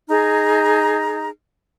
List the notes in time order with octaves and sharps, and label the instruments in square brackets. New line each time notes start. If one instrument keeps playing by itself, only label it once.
[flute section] D#4 G#4 A#5